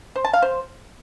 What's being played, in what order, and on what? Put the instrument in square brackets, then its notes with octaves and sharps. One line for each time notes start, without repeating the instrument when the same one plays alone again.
[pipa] C5
A5
F5
C5